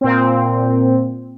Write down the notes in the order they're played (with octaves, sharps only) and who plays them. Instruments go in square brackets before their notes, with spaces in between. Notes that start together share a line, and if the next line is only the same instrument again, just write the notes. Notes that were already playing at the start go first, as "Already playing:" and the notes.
[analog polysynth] A#2 C4